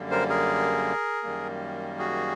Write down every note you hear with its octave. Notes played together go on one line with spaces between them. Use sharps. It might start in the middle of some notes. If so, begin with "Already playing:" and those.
Already playing: F#2 D3 G3 A#3
A#4 C5
G#4 A#4
F#2 D#3 G3 A#3
F#4 G#4